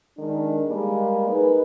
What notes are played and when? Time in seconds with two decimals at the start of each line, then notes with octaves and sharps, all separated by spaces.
0.18 D#3 G#3 D4
0.68 G3 G#3 A#3
1.28 D#4 G#4 A#4 B4